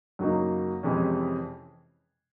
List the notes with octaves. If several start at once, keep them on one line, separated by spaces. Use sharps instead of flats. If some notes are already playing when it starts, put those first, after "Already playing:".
F#2 C#3 F#3 A#3 D#4
F2 C3 E3 G#3 C#4